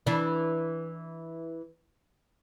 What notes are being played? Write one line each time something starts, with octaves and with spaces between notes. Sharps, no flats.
E3 D4